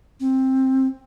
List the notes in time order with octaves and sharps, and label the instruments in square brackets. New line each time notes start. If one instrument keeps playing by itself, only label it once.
[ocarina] C4